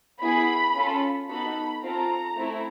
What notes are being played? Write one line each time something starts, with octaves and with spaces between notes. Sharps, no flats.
B3 E4 G#4 B5
C#4 F4 A4
B3 D#4 F#4 A4 B5
C4 F4 A4 A#5
A3 C4 E4